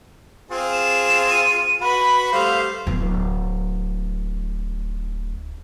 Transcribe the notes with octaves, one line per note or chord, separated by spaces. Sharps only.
C4 F4 G#4
E7
D#7
F#4 B4 B5
G3 A3 C5 F5
D1 B3